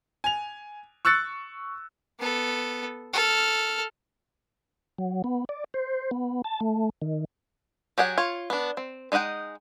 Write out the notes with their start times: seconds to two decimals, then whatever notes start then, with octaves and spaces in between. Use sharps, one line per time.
0.24 G#5 F7
1.05 C#6 E6 F#6 A6 C#7
2.19 B3 A4
3.13 A4 F6
4.98 F#3
5.24 B3
5.49 D5
5.74 C5
6.11 B3
6.44 A5
6.61 A3
7.02 D#3
7.98 F#3 G4 G#4 F#5
8.18 F4 C#5
8.50 B3 D4
8.77 C4
9.12 G#3 D#4 D#5 F#5 G5